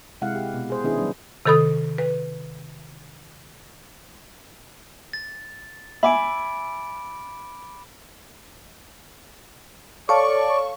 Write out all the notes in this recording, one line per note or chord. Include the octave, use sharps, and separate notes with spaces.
C3 G#3 E4 F5 F#5
G4
B2
G#4 C5
D#3 B3 C#4 D4 E4 G#4
F#3 G3 B3 D4
C3 D#3 A4 B5 D#6
B4
A6
E5 G#5 B5 D6 D7
A4 C#5 D5 F5 A5 C#6